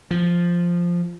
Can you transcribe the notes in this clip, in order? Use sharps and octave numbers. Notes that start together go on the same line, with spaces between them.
F3